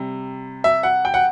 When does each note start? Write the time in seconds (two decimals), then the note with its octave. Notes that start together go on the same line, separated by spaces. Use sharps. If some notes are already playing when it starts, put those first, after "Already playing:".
Already playing: C3 G3
0.64 E5
0.83 F#5
1.05 G5
1.14 F#5